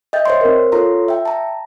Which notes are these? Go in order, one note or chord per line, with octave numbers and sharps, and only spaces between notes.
D#5 E5 G5 G6 A6
C5 C#5 C6
C4 A#4
F4 A4 C#5 A#5 C6
E5 G5
A5 A#5